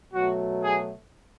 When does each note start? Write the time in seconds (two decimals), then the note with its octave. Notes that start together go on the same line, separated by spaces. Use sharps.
0.13 B2 F#3 A3 F#4
0.62 G#4